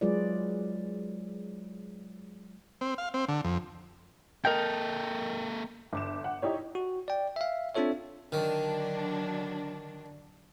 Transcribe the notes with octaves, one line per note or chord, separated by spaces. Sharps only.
F#3 G#3 F4 G#4 B4 D5
C4
F5
C4
D3
F2
A#3 A4 A#4 D#5 G5
G1 D6 E7
F#5
D#4 E4 G4 C#5
F#4
D5 G5
E5 F5
C4 D4 F4 A4 C#5 E5
D3 D#3 F#3 D4